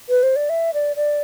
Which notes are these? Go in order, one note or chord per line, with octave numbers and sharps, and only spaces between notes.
B4
C5
D5
E5
D5
D5